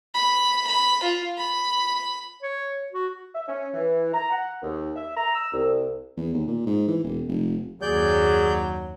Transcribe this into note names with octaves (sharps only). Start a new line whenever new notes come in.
B5
B5
F4
B5
C#5
F#4
E5
C#4
E3
A#5
F#5
D#2
E5
A#5
E6
C2
E2
D#2
A#2
G#2
E3
E1
F1
F#1 D#2 F#3 G#4 D5 G6